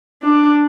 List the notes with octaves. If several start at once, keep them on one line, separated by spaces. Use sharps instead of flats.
D4